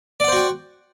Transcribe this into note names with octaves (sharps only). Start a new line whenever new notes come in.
F#4 C5 D5 F#5 G5